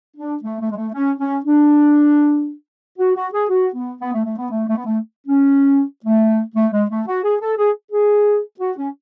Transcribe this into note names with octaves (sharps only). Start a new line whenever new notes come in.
D4
A3
A3
G#3
A3
C#4
C#4
D4
F#4
F#4
G#4
F#4
B3
B3
A3
A3
B3
A3
A3
B3
A3
C#4
A3
A3
G#3
A3
F#4
G#4
A4
G#4
G#4
F#4
C#4